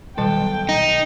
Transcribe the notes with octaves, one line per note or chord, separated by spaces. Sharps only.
B1 D#3 G3 A4 G5
D#4